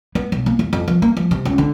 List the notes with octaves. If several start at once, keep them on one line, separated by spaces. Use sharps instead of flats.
B3
B1
A#3
E2
F2
F3
A#3
F3
C3
C#2
D3